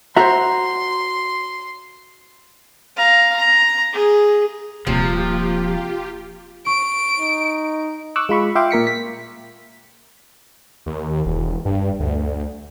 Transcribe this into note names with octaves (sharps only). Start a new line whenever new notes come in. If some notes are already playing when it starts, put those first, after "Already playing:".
F#4 C5 E5 A#5 C6
F5 A#5
A#5
G#4
D#1 C3 F3 A#3 F4 G4
C#6 D7
D#4
C#6 D6 E6 F#6
G#3 F4 B5 C#6
F4 E5 F5 G5 C6 D6
A#2 A#4 B6 C#7
B6
D#2
E1
G2
D2